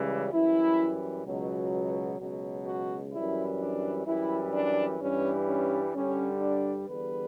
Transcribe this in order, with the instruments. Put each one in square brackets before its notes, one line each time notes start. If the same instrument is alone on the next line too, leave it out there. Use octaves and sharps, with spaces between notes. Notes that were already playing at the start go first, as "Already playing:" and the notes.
Already playing: [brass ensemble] C#2 C#3 E3 G3
F#2 E3 G3 E4
C#2 B2 F#3
C#2 B2 F#3
F#4
F#2 E3 G3 E4
D4
F#2 E3 G3 E4
D4
G2 E3 G3 C#4
C#4
G2 D3 G3 C#4
D4
E2 D3 G3 B4